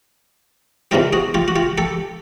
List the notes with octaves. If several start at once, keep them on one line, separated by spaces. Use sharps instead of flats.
E2 C3 D#3 F#3 F4 G4
F#4 G#4
F4 G4
F#4
F4 G4
G4 A4